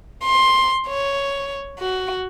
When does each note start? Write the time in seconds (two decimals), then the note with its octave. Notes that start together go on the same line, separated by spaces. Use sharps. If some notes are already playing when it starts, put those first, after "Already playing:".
0.25 C6
0.88 C#5
1.79 F#4